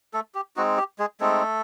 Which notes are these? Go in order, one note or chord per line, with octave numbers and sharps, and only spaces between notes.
A3 A4
G4
G#3 C4 D#4 F#4
G4
G#3 G#4
G#3 A3 C4 D#4 A4